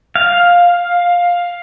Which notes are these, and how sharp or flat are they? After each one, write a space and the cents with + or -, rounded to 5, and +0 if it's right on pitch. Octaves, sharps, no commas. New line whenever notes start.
F5 +10